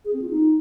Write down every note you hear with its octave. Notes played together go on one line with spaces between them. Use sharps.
G#4
C4
F4
D#4